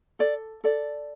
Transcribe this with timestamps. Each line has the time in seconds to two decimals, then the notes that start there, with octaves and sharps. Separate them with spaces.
0.19 A4 D5
0.64 A4 D5